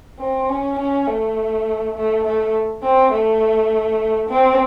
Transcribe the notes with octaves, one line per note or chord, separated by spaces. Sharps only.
C4
C#4
C#4
A3
A3
A3
C4
A3
C4